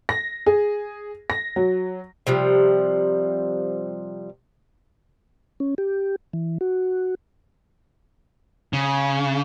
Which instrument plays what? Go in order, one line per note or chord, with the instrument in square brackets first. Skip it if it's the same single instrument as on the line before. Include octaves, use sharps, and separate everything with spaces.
[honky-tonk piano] A#6
G#4
A#6
F#3
[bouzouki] C3 F3 G3
[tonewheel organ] C#4
G4
E3
F#4
[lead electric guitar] C#3